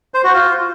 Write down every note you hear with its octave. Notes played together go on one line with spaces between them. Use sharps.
C5
F#4
F4